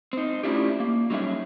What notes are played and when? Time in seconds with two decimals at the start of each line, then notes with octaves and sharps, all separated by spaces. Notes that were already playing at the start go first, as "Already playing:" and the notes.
0.13 C4 D#4
0.43 A3 C#4 D4 E4 F4 G4
0.80 A#3
1.10 F#3 G3 C#4 D#4 G#4 E5